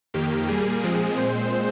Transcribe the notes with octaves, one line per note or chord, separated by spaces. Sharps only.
F2 D#3 A#3 G4
A#2 G3 A#3 G#4
A#2 F3 G#3 C4
A#2 G#3 C4 C5